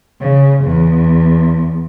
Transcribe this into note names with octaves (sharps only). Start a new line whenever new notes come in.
C#3
E2